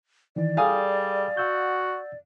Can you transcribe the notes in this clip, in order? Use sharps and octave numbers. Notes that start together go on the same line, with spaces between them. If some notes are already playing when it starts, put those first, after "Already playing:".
D#3 E3 D5
G3 G#4 A4 F5 G5 G#5 D#6
F#4 F#5 E6 G6